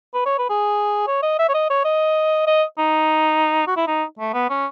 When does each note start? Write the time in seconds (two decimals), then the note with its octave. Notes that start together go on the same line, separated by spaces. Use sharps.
0.14 B4
0.26 C#5
0.38 B4
0.50 G#4
1.07 C#5
1.23 D#5
1.39 E5
1.49 C#5
1.54 D#5
1.70 C#5
1.85 D#5
2.47 D#5
2.78 D#4
3.67 F#4
3.77 E4
3.88 D#4
4.19 A3
4.34 B3
4.50 C#4